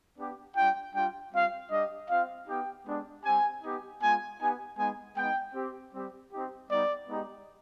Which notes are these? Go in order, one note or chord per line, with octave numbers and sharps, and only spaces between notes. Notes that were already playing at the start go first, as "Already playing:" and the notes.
B3 D4 G4
G3 D4 F4 G5
G3 D4 F4 G5
G3 C4 F4 F5
G3 D4 G4 D#5
C4 F4 F5
B3 D#4 G4 G5
G#3 B3 D4 G4
G3 C4 G4 G#5
B3 D#4 G4
G#3 B3 F4 G#5
B3 D#4 G4 G#5
G#3 B3 D#4 G#5
G#3 B3 D#4 G5
C4 G4
G3 C4 G4
C4 D#4 G4
G3 B3 D#4 D5
G#3 B3 D#4 G4